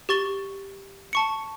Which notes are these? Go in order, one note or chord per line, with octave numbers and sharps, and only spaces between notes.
G4 C#6 A6 G7
A5 C#6 C#7